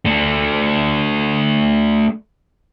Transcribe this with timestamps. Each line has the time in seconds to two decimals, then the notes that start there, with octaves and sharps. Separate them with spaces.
0.06 A3 D4